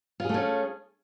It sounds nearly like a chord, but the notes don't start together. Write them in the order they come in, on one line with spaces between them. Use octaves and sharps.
F4 G#4 A3 C#4